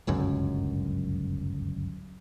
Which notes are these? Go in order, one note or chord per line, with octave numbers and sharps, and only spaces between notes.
D1 G1 C#2 F#2